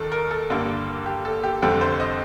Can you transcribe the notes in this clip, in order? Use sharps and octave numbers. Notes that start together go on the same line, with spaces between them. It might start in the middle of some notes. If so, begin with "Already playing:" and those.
Already playing: D#2 D#3 A4
A#4
A4
G2 D3 G3 A#3
G4
A4
G4
F1 F2 D3 G3 C4 A4
C5
D#5